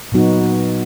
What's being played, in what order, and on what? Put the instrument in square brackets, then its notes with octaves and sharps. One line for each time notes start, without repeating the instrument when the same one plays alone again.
[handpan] A#2 F#3 B3 D#4 F#4